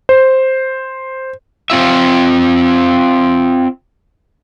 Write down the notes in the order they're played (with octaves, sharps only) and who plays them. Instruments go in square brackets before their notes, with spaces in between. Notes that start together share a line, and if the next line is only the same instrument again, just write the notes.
[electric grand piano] C5
[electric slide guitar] C4 F4 E5